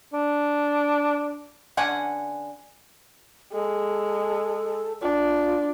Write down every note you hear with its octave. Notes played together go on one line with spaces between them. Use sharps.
D4
D3 C#4 F#5 G#5
G#3 A4
D4 F4